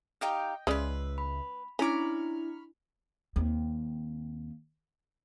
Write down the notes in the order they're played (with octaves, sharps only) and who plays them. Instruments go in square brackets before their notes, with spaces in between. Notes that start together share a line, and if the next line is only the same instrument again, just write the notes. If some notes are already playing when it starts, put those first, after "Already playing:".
[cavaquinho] D#4 G4 F5 [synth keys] D#5 G5
[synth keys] C#2 E5 [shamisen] G#3 C#4 D5 [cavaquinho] B4 C6
[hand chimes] B5
[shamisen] C#4 [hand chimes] D4 E4 [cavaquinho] A#5 D6 [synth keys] B5 C#6 F6
[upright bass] D#2 C4